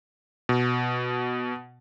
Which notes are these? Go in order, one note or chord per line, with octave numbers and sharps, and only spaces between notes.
B2